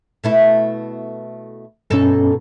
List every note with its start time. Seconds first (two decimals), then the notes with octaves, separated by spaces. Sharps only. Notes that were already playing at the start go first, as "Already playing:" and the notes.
0.24 B2 A3 E4
1.90 G2 B2 C#4 D#4 A4